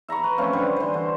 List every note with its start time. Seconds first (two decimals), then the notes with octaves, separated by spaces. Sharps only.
0.08 E5 A#5 B5 C#6
0.24 B4
0.38 F3 A3 C4 C#4
0.53 D3 G3 B4
0.76 E3 C5
0.94 D3